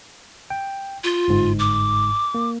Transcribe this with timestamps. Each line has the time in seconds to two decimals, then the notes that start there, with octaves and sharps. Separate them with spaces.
0.50 G5
1.04 F4
1.28 G1 G#2
1.59 D6
2.34 A#3